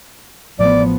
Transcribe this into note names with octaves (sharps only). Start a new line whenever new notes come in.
A1 A2 F3 B3 D5